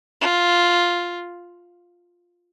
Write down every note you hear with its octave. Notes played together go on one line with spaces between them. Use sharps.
F4